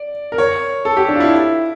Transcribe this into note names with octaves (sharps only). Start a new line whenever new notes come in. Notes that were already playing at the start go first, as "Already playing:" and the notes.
Already playing: D5
A#4
C#5
A4
G4
D4
F4
E4